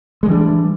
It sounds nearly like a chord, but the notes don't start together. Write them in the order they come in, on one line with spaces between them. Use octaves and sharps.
G#3 G3 E3 D4